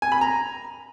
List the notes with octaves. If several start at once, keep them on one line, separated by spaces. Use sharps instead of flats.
G#5
B5
A#5